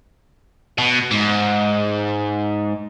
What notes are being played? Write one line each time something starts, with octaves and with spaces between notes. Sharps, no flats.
B2
G#2